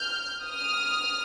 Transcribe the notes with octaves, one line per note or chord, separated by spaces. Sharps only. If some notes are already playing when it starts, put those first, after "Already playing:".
Already playing: F6 G6
D#6 F6